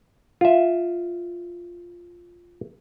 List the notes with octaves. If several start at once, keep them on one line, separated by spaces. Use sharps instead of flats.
F4 E5